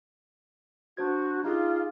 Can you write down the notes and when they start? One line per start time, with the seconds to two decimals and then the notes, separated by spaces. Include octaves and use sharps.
0.97 D4 F#4 C5 G#6
1.44 D#4 F4 G4 G#4